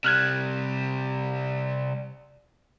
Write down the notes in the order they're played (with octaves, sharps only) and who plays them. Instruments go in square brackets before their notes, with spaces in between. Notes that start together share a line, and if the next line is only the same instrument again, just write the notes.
[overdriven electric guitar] C3 G3 [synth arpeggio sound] F6 F#6 G#6